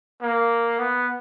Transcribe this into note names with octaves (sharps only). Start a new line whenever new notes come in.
A#3
B3